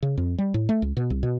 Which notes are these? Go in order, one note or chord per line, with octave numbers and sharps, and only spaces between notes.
C#3
F2
G3
A2
A3
C#2
B2
C2
B2